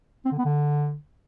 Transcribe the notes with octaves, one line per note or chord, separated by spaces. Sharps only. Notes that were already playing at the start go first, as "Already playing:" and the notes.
C4
D3
B3
D3